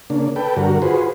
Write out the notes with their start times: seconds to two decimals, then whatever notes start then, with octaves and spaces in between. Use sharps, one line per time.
0.10 C#3 A#3 D4
0.36 A4 B4 G5
0.56 G2 D3 F#4 A#4
0.82 F4 F#4 G#4 B4 C5